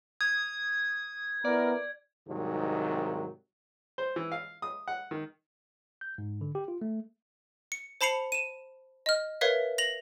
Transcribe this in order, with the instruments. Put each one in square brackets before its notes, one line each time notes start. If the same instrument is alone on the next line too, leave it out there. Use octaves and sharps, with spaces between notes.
[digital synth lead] D#6 [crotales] G#6
[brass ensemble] B3 E4 A#4 [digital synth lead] D5
[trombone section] C2 G#2 C3 D#3 F#3
[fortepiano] C5
E3
F5
D#6
F#5
D#3
[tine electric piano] G6
G#2
D3
G4
F4
A3
[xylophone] C#7
C5 A5 B5 C7 C#7 F7
D#7 E7
D#5 F6
A#4 B4 C#5 E5 F5
A#6 F7 F#7